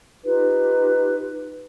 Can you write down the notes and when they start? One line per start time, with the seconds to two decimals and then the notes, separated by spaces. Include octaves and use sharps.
0.25 D#4 F4 G4 B4